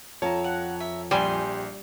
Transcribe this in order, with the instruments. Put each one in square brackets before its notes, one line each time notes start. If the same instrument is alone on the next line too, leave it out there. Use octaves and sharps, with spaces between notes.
[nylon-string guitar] F2 A5 [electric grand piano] C#5 A#5
[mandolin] F#5
E5
[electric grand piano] A#1 [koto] G3 [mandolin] G4 G#5 C6